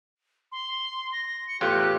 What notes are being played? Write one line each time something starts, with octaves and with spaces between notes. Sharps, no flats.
C6
A#6
C#7
E2 A2 F4 G4 F#6